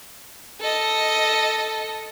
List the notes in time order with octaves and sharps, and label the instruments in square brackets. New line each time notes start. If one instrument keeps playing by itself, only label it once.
[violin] A4 D#5